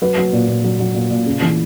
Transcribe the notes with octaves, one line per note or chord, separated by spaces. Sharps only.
F#3 B4
F#3
A#2
A#2
F#3
F#3
A#2
A#2
C#3
E3